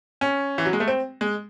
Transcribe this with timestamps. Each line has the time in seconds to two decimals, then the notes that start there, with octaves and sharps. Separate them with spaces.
0.21 C#4
0.58 E3
0.65 F#3
0.73 G#3
0.80 A3
0.88 C4
1.21 G#3